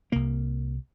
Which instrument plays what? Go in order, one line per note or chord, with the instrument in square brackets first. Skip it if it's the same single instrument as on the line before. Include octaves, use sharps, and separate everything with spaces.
[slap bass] C2 C3 A#3